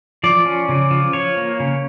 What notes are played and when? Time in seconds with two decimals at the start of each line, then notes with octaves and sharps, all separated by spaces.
0.24 F3 D5
0.45 C#4
0.69 C#3
0.91 F3
1.13 F3 C#5
1.37 A#3
1.60 C#3